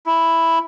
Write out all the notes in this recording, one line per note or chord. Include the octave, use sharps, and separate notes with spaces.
E4